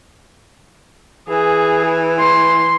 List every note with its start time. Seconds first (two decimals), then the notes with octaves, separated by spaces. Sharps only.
1.29 E3 G#4
2.19 C6